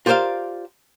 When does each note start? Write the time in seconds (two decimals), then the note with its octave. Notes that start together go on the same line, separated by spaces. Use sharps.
0.06 F4 G4 A#4 C5 D5 F5